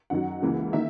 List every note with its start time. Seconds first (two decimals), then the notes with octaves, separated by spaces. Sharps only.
0.10 F#2 D#3 F#3 F#5
0.42 C#2 C#3 E3 A#3
0.73 D#3 A#3 E5